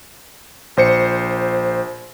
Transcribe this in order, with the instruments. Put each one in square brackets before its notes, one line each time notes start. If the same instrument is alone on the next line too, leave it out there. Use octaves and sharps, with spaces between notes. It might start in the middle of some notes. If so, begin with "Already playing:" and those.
[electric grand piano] A#1 C5 C#7